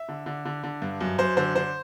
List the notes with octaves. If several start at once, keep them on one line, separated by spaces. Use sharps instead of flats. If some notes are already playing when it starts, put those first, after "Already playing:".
Already playing: E5
D3
D3
D3
D3
G2
F#2
F#2 C5
D3 C5
D3 C5